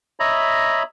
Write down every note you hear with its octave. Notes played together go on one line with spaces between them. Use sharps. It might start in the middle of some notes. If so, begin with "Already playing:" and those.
C#5 D#5 E5 A#5 B5